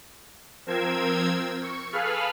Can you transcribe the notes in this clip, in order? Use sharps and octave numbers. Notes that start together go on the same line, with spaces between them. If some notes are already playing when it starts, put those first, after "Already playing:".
F3 C4 A#4 C5 E6 G#6
C#6
G#4 A4 B4 F5 B5 F6